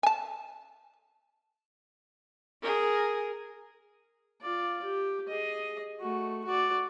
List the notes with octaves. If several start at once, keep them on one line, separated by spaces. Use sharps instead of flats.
G#5 A5
G#4 A#4
F4 D5
G4
G#4 D#5
A3 F#4
F#4 D5